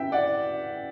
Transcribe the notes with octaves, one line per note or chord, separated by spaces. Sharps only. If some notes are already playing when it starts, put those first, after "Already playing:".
Already playing: C#4 E4 B4 E5 G5
D5 F#5